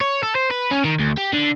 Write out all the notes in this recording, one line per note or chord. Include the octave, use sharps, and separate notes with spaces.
C#5
A4
C5
B4
C#4
D#3
D2
G4
D3